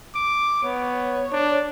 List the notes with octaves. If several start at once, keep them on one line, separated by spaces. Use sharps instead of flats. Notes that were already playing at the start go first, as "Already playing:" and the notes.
D6
B3 C#5
D4